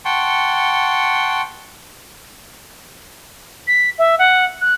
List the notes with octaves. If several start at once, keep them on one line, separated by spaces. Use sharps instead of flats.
F#5 G5 A5 C6 C#6
B6
E5
F#5
F#6